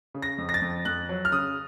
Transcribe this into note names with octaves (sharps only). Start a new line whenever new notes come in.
C#3
A#6
F2
A#6
A6
F2
F2 F#6
F#3
F6
C#3 D#6